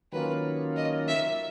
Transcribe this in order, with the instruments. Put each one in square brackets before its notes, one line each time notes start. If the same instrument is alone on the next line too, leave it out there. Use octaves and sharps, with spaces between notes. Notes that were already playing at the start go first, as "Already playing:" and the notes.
[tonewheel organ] D#3 F#3 A#3 C#4 F4 [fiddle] B4
[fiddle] D#5
E5